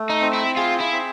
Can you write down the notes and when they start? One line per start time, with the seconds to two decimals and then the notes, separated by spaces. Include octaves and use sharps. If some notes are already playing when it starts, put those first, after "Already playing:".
Already playing: A3
0.10 D#4
0.21 C4
0.33 E4
0.56 F4 G#4
0.80 E4
0.92 C4